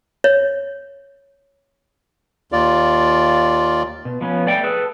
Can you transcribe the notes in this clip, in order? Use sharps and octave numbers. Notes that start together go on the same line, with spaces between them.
C#5
D#2 F4 D5
B2
F3 B3 C#4
A3 D5 G5
G#4 A4 B4